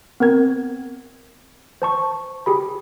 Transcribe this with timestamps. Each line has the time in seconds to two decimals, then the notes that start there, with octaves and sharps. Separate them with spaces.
0.20 B3 C4 A#4 G#6
1.82 C5 A5 C#6
2.46 G4 G#4 B5